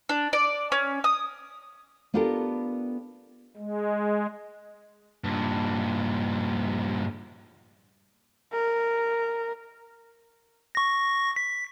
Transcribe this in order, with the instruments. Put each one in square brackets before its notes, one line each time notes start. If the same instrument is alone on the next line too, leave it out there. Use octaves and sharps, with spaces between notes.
[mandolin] D4
D5
C#4
D#6
[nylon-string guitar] B3 D4 F4 G4 A4 A#4
[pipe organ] G#3
[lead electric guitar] G2 A#2
[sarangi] A#4
[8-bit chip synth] C#6 A#6
B6